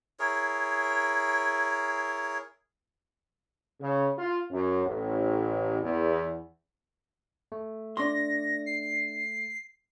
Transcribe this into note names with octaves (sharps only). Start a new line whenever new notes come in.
E4 G#4 A#4 C#5
C#3
F4
F#2
A1
E2
A3
D4 C6 A#6
C7